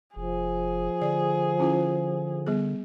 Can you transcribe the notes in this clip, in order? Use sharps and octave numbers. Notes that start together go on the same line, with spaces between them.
F1 F3 G#4
D3 D5
C#4 E4 F4
G3 B3 G#4